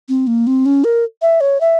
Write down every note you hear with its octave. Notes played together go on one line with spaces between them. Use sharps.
C4
A#3
C4
C#4
A#4
E5
C#5
E5